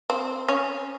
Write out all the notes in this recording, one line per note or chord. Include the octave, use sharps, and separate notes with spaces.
C4
C#4